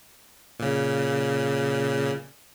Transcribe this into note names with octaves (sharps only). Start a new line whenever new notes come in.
A#2 C#3